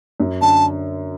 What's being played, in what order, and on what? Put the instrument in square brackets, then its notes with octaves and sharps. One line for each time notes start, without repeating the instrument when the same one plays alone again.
[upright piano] F#2
[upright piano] D3 [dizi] A5